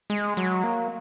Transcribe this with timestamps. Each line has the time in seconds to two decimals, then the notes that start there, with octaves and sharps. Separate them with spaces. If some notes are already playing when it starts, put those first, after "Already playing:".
0.10 G#3
0.37 F#3
0.64 A#3